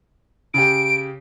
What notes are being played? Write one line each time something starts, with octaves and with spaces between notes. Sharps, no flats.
C#3 G4 D7